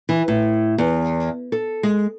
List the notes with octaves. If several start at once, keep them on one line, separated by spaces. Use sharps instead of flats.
E3
A2
E2
A4
G#3